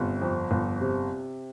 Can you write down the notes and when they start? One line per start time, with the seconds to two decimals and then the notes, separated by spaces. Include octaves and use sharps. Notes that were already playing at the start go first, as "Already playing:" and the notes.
Already playing: G1 C3
0.22 F2
0.51 G1
0.81 C3